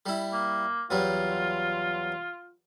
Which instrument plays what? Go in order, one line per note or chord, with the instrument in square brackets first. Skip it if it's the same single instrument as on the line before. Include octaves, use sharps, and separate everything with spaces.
[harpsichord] G3 E4
[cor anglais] A#3
[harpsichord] E2 F#3 G3 [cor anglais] F4